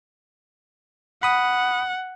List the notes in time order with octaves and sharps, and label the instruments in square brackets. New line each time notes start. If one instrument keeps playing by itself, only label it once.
[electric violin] F#5 [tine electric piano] B5 D#6